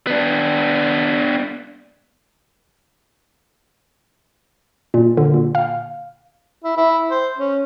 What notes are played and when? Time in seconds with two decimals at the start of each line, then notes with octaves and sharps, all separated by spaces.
0.07 B3 D4
4.94 A#2
5.17 D3
5.34 A#2
5.55 F5
6.64 E4
6.77 E4
7.11 C5
7.38 C#4